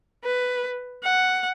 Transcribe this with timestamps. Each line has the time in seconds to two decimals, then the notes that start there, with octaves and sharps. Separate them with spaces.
0.24 B4
1.03 F#5